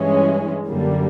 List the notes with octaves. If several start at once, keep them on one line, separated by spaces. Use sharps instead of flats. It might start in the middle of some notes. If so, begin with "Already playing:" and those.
Already playing: G2 E3 G#3 C#4
F#2 D3 G3 A#3